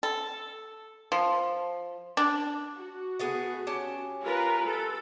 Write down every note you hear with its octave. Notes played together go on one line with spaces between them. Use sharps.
A4
F3
D4
F#4
A3 B3 G#4
C#4 G4 A5
F4 A#4 B4
A4